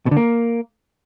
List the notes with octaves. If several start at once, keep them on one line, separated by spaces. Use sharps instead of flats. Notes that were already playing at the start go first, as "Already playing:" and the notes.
B2
D3
A#3